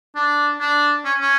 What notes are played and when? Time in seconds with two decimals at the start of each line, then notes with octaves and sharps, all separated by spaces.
0.16 D4
0.60 D4
1.05 C#4
1.21 C#4